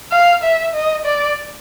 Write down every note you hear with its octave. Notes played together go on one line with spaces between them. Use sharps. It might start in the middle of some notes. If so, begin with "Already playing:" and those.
F5
E5
D#5
D5